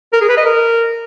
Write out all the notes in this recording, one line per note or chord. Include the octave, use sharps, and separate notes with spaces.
A#4
G#4
B4
D#5
A#4